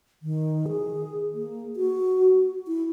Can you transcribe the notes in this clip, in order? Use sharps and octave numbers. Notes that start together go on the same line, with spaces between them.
D#3
G#4
A#3
F#4
E4